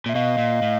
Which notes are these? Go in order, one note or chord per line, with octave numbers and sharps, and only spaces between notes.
A#2 E5
B2 D#5 F5
A#2
A2